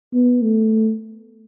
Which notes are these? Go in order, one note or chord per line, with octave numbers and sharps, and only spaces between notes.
B3
A3